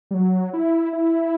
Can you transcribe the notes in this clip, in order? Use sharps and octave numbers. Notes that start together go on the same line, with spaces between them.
G3
F#3
E4
E4